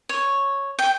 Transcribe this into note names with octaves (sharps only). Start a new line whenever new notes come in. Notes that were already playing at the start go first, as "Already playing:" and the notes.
C#5
G5